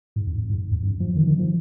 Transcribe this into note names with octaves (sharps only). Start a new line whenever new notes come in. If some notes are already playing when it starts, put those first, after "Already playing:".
G#2
F2
G#2
F2
G2
F3
D#3
D#3
F3